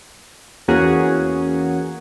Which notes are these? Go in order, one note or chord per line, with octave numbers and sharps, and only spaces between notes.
E2 A#3 C#4 F#4 G#4